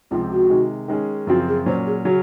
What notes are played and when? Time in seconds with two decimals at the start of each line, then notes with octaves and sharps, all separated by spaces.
0.11 C#2 C3 F3 C4 F4
0.31 F#4
0.50 C3 D#3 G#3
0.88 D#3 G#3 C#4 G#4
1.27 F#2 C#3 F3 C4 F4 F#4
1.47 G#4
1.66 A#2 F#3 C#4 C5
1.86 G#4
2.05 C#3 F#3 C#4 F#4